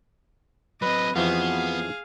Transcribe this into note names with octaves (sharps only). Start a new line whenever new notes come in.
F#3 C4 B4 D#5
F2 E3 F3 B3 F#4 G#4 F5